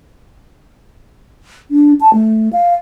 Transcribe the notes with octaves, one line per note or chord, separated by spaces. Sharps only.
D4
A5
A3
F5